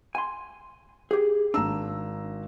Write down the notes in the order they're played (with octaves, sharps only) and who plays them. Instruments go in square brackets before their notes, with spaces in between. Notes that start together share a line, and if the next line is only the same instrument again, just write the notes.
[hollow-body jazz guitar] G#5 C6
G4 G#4
[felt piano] G#1 A#5 E6 [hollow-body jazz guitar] D4